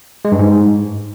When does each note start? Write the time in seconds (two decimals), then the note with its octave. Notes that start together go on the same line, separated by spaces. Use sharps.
0.25 G#3
0.32 G2
0.39 G#2